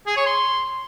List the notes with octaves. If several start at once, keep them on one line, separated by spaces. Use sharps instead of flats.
G#4
C#5
C6